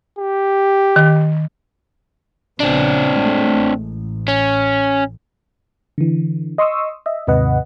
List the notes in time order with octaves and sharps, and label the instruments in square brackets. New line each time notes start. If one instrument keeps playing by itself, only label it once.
[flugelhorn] G4
[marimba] D#3
[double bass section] A#1 C#3 B3 [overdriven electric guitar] C4 D4
[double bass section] G#3 A3
A1
[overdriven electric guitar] C#4
[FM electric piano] D3 E3
D#5 C6 C#6 D#6 E6
D#5 E5
D#2 G#2 C3 B4 D#5 F#5